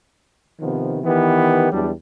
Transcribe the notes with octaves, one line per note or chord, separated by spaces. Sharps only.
C3 D#3 F3 B3
D#3 E3 B3 G4
E2 F#3 G3 D4